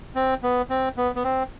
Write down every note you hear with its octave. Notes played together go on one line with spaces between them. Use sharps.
C4
B3
C4
B3
B3
C4